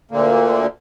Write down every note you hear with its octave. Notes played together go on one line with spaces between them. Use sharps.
D2 A#2 D3 A#3